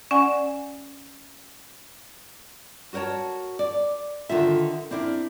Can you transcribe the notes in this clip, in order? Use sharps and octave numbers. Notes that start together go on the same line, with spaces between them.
C#4 D5 F#5 G#5
F#4 A#4 C5 C#5 A5
D5
D3 D#3 F4 E5
C4 D4 E4 A#4